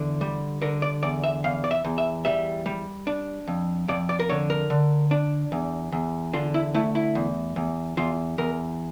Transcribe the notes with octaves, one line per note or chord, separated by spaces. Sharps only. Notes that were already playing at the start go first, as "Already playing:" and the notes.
Already playing: E2 D3
G3
D3 A#4
D5
E2 D5
E5
E2 F5
D5
E5
E2
E5
G3 E5
G3
D4
F2
F2 D5
D5
A#4
D3 C#5
A#4
D3
D4
E2
E2
D3 F4
E4
A3 E4
E4
E2
E2
E2 F4
E2 A#4